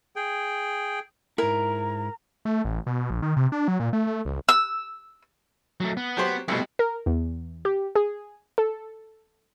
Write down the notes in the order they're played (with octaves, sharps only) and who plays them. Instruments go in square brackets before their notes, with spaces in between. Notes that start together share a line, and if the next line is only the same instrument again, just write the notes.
[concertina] G#4 G5
[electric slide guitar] G#2 E4 [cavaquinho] A#4 [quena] A#5
[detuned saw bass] A3
A1
B2
A#1
D#3
C3
D4
F#3
A#2
A3
A3
C#2
[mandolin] E6
[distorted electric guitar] F#3 A3
B3
[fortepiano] F#3 G4 C5
[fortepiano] C2 B2 [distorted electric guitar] A3 C4
[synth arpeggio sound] A#4
E2
G4
G#4
A4